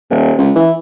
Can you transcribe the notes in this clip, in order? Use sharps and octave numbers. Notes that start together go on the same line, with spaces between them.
D#1
C#2
E3